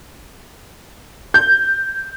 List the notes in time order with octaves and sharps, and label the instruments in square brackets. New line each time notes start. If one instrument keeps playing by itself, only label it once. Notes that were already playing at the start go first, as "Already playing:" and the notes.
[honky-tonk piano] G6